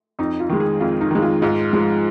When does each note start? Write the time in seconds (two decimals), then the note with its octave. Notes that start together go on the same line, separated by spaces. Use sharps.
0.19 F2 D#4
0.40 F4
0.49 D#3 G#3
0.60 G#4
0.81 F2 F4
1.01 D#4
1.11 D#3 G#3
1.22 F4
1.42 G#2 F4
1.73 F3 G#3